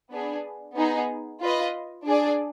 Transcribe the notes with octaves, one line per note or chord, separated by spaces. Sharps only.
B3 D4 G#4
B3 D#4 G#4
F4 B4 D#5
D4 G#4 D5